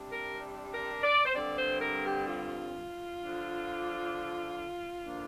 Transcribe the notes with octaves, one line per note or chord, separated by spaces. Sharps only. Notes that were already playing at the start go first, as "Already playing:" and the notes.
Already playing: C3 G3 D4
A#4
A#4
D5
C5
G2 D3 G3 C4 D5
C5
A#4
G4
F4
D3 F3 D4
D3 F3 A#3 D4